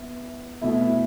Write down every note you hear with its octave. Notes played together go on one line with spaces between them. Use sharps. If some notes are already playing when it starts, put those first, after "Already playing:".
Already playing: B3 E4
B2 A3 E4